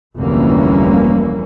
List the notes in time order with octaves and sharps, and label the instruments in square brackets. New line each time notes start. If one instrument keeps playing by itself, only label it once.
[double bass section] F1 D2 E3 G3 A#3 C#4